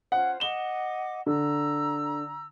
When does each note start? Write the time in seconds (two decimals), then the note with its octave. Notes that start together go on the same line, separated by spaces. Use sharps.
0.12 C#4 F4 C5 F#5
0.40 D#5 F#5 D6 E7 G7
1.26 D3 A#5 E6